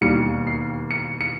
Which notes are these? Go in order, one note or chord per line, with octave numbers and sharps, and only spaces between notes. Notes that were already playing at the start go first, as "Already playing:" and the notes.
E1 D#2 D#3 G3 A#3 C#7
C7
C#7
C#7